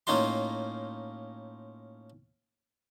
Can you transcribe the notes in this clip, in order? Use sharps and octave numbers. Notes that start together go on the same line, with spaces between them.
A2 A#3 C#4 D#4 F4 C6